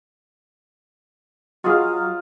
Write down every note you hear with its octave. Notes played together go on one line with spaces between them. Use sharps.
F#3 F4 F#4 G#4 D#5 F5